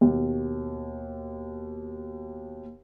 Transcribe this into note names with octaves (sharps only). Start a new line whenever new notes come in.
D#2 B2